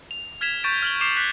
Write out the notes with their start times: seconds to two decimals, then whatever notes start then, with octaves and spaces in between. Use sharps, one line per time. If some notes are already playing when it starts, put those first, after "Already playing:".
0.11 F7
0.41 F6 G#6 B6 E7 F7 G7
0.64 C#6 G6 A6 D7 E7
0.82 F6 F#7 G7
1.01 D6 C7 C#7 E7 F7
1.17 F#6 B6 F#7